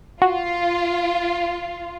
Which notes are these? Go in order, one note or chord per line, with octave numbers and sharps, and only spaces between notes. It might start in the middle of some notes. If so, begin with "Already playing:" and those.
F4 F#4